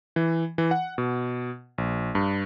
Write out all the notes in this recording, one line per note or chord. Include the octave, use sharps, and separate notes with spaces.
E3
E3
F#5
B2
A#1
G2